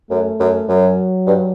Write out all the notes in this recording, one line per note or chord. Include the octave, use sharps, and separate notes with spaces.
F#2 A3
F#2
F#2 F#3
G2